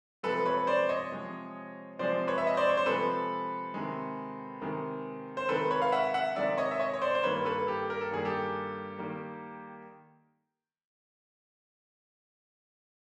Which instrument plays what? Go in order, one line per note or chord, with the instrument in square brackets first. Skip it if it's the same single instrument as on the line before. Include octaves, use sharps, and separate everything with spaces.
[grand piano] C3 F3 G#3 A4 B4
B4 C#5
C5 D5
C#5 D#5
C3 F3 G#3
C3 F3 G#3 C5 D5
B4 C#5
E5
D#5
C5 D5
C#5
C5
C3 F3 G#3 A4 B4
C3 D#3 G#3
C3 D#3 G#3
C5
C3 D#3 G#3 A4 B4
B4 C#5
F5
E5 F#5
E5 F#5
C3 D#3 G#3 D5 E5
C#5 D#5
E5
C#5 D#5
C#5
C5 D5
C5
G2 D#3 G3 A#3 B4 C#5
A4 B4
G4 A4
A#4
A4
G2 D#3 G3 A#3 G#4
G4 A4
D#3 G3 A#3